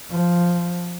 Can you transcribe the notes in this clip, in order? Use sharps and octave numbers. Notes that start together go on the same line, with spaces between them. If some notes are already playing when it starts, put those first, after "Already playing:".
F3